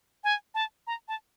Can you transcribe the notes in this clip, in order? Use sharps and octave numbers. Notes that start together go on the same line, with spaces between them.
G#5
A5
A#5
A5